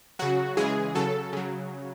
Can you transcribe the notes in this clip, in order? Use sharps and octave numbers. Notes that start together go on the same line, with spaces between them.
C#3 F#3 F#4
C#3 E3 G#3 G#4
C#3 F#3 A4
C#3 F#3